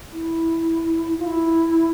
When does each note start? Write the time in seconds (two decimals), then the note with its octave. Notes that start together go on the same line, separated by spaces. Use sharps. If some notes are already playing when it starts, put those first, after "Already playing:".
0.13 E4
1.19 F4
1.26 E4